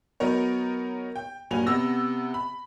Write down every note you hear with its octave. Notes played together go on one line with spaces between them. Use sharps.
F#3 B3 D#4 A#4 C#5
G5
G2 A#2 F#3 G#5 F7
C3 B3 F#5 E6 A#6
B5